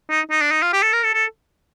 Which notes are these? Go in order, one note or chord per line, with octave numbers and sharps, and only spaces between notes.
D#4
D#4
D4
D#4
F4
G4
A4
A#4
A4
A4